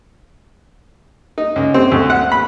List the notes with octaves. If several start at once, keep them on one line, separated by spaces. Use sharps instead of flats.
D#4
C#2
C4
D2
F#5
B5